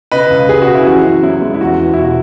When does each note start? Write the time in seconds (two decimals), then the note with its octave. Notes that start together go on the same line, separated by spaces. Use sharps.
0.12 C#3 B4 D#5
0.30 C#2
0.49 C#2 G#4
0.62 F#4
0.67 C#3
0.75 E4
0.87 E3 F#4
1.05 F#2
1.23 F#2 E4
1.41 G#3
1.54 E4
1.61 E2 F#4
1.79 E2
1.94 E4
1.98 B2 F#4